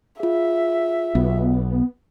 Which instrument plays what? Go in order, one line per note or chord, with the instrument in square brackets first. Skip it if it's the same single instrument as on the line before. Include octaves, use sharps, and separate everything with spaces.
[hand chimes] F4 G#4 [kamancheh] E5
[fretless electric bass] B1 [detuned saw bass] B3